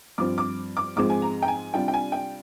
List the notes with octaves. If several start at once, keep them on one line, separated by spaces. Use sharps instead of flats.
G2 F3 C4 D6
D6
D6
G#2 F3 G#3 C4 D6
G#5
A#5
G5
G#5
C3 G3 D4 F4 G5
G5
G#5
G5